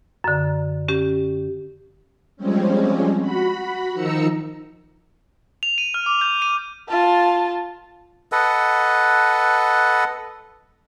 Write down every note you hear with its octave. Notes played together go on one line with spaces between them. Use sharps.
F#2 D3
C#4 G4
F3 G3 G#3 C4 C#4
F#4 B5
D#3 F3 D#4 A#5 E6 C#7
F7
D#7
F6
D6
G6
D#7
F4 A5
A4 B4 D#5 F#5